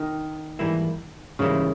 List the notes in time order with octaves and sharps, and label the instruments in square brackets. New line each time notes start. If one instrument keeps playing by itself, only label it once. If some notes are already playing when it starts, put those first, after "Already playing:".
Already playing: [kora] D#3
[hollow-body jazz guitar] G#2 E3 G3 A#3 E4
[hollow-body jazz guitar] G#2 E3 G3 A#3 E4 [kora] C#3